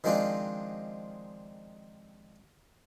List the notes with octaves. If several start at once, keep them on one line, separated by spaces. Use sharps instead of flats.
D#3 F3 G#3 C4 D4 F4